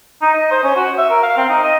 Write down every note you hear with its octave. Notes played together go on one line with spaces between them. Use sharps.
D#4
D#5
C5
C#4
F#4
E5
A#4
F5
C4
D#4
D#5